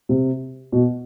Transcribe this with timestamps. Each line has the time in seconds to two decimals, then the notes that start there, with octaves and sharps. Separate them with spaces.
0.09 C3
0.72 B2